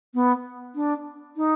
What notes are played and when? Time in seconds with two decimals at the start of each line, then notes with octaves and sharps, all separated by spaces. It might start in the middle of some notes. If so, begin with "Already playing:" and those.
0.14 B3
0.75 D4
1.36 D#4